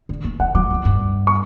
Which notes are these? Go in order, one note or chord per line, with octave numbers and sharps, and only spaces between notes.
D3
E3
E3 F#5
F#3 D6
F#3
G2
C#6